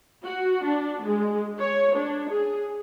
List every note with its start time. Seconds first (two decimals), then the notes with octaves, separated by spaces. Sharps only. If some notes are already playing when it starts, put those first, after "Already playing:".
0.24 F#4
0.63 D4
1.05 G#3
1.60 C#5
1.96 D4
2.29 G#4